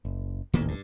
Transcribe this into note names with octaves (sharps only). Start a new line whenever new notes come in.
F#1
D#1 A1 D2 D#3 A#3 B3
G2